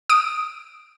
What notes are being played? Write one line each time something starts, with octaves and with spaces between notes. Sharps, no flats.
D#6 D7